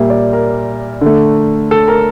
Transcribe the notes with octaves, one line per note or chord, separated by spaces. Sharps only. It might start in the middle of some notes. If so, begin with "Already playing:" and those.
Already playing: A#2 G3 A#3 E5
D5
A#4
D3 A3
A4
A#4